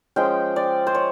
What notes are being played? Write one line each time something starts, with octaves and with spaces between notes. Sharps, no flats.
F3 G#3 C#4 G5
D5
C5
C#5